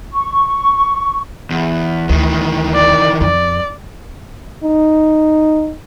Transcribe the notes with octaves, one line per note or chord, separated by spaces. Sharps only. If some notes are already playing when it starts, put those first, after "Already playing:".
C#6
E2
D2 D#3 E3
D5
F2 D5
D#4